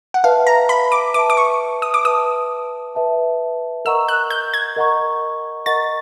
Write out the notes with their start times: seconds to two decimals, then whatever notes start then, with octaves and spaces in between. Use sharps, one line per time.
0.14 F#5
0.24 B4 E5 F5 A5
0.47 A#5
0.69 B5
0.92 D6
1.14 B4 E5 A5 D6
1.30 D6
1.37 C#6
1.82 D#6
1.94 D6
2.05 B4 E5 A5 D#6
2.95 B4 E5 A5
3.85 A#4 D#5 F#5 A#5 C#6 E6
4.08 F#6
4.30 G6
4.54 G#6
4.76 A#4 D#5 F#5 A#5 C#6
5.66 A#4 D#5 F#5 A#5 C#6 A6